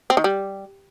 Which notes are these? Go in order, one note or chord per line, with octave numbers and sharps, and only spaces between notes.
C4
D#3
G3